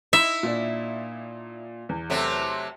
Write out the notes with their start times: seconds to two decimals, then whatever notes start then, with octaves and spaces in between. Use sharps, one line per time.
0.13 D#4 E4 E5
0.43 A#2 D4
1.89 E2
2.10 C3 F#3 A3